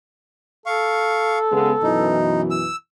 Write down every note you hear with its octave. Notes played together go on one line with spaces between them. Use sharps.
A4 F5 C#6
C#3 G#3 B3
F#2 B2 E3 D#4
E6